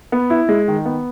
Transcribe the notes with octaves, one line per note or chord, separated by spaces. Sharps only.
B3
E4
G#3
D#3
B3